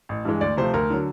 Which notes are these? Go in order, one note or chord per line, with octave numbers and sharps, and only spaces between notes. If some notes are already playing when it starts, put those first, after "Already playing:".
A1
G2 E3 G#3
D2 D5
C3 F3 A3 C5
D2 A#4
D3 F#3